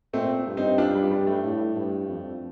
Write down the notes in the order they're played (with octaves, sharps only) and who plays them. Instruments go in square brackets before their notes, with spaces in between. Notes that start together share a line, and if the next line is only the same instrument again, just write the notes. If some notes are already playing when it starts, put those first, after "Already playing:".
[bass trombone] A#2 [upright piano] A3 C4
[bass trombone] G2
[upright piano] C4 D#4
D4 F4
G3
G3
A3
[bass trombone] A2
G2
F2